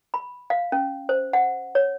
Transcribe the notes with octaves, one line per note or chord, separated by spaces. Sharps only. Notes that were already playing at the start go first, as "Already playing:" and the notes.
B5
F5
C#4
C5
F#5
C#5